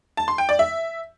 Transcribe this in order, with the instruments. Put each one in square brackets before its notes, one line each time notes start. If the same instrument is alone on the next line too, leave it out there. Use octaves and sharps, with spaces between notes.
[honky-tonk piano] A5
C6
G5
D5
E5